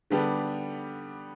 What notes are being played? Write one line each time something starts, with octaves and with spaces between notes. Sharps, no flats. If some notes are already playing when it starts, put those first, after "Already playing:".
D3 G3 B3 D4 G4